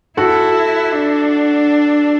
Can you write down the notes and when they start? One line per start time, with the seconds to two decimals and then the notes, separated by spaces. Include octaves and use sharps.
0.17 E4 F#4 A4
0.91 D4